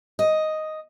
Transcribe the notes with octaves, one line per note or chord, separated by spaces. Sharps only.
D#5